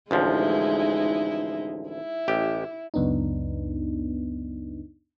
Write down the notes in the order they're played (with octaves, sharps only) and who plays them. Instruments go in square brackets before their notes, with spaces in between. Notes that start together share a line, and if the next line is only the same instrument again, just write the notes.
[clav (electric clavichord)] A1 D2 F3 [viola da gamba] G#3 D#4 E4
[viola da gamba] E4
[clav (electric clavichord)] A1 G4
[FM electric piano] C#2 F#2 B3 D4 D#4